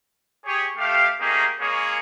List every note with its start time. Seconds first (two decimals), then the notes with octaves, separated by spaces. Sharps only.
0.45 G4 G#4 C#5
0.77 A3 G4 F5
1.19 A3 A#3 C#4 D#4 G4 G#4
1.61 G#3 A#3 C#4 G#4 C#5